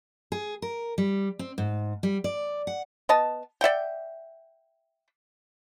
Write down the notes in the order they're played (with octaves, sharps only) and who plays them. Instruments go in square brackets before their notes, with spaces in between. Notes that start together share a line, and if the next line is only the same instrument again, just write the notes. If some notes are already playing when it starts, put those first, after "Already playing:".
[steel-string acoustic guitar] G#4
A#4
G3
C4
G#2
G3
D5
F#5
[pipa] B3 D#5 A5
D5 E5 F#5 G5